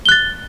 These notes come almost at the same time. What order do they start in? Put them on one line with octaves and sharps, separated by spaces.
G7 F#6 A6